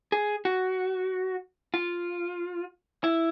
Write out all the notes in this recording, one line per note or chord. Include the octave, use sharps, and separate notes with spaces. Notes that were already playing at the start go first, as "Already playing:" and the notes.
G#4
F#4
F4
E4